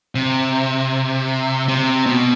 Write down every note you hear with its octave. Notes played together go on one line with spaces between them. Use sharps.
C3
C3
B2